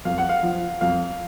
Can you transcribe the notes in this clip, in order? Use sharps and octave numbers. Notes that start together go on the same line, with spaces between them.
F2 F5
F#5
F5
F3
F2 F5